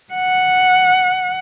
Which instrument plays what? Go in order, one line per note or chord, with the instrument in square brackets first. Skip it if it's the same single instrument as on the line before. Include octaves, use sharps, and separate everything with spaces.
[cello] F#5